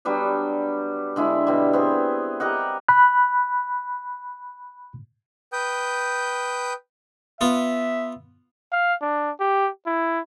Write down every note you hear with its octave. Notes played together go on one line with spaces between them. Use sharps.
F#3 G3 B3 D4
D3 G#3 E4
B2 G3
B3 C4 G#4
G4 A#4 D#5 F#5
B5 F#6
B4 G5 D#6 G6
B3 F4 E5
F5
D4
G4
E4